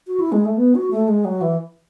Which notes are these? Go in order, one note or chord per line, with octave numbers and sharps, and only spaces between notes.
F#4
E4
G#3
A3
B3
F#4
A3
G#3
F#3
E3